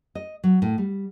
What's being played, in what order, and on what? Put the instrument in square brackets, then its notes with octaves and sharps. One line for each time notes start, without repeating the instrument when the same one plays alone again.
[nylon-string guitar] D#5
F#3
A2
G3